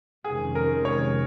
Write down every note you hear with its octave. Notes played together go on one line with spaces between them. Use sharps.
F2 C3 D#3 G#3 C#4 G#4
A#4
C#5